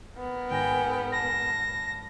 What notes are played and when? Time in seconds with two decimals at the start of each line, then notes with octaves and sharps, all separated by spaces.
0.18 B3 A#4
0.50 G#1 G5 G#5 A#6
1.12 A5 B5 F6 A#6